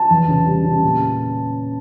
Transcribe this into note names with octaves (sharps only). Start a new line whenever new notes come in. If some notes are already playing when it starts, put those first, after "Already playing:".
Already playing: A5
E2
C#3
G3
C#3
A#2